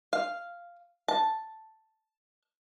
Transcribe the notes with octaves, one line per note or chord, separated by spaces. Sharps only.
F5
A5